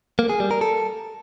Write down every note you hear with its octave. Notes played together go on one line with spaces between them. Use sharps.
A#3
G#4
G3
A#4
A4